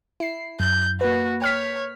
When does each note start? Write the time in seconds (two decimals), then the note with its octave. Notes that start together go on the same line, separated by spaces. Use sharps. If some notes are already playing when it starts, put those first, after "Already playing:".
0.20 E4 C7
0.60 F#2 G6
1.01 A#3 F#4 B4
1.42 C#5 G5 F6 B6